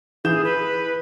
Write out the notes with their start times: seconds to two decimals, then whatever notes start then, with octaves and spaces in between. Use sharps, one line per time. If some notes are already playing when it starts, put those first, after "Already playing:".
0.25 E3 G#4 G6 E7
0.44 B4